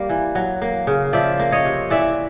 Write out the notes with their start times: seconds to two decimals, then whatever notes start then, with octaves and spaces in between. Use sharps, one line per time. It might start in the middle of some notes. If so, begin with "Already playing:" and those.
Already playing: G3 A#3 D5
0.09 E3
0.35 F#3
0.62 A#3
0.87 C#3
1.13 F3 D5 E5
1.39 A#3
1.52 C#5 D#5
1.65 C3
1.90 E3 D5 E5